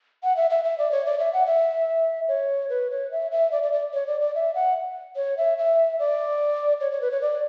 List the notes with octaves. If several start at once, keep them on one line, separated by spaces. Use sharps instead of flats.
F#5
E5
E5
E5
D5
C#5
D5
E5
F#5
E5
C#5
B4
C#5
E5
E5
D5
D5
D5
C#5
D5
D5
E5
F#5
C#5
E5
E5
D5
C#5
C#5
B4
C#5
D5